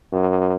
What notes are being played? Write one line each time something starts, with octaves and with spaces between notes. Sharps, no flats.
F#2